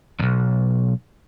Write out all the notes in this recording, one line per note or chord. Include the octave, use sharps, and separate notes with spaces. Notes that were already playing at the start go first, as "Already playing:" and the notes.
B1 E2